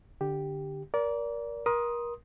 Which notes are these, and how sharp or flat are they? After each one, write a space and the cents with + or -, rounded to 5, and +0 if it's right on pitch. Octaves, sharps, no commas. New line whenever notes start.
D3 +0 G4 +0
A#4 +20 D5 -25
A#4 +30 C6 +0 D#6 +0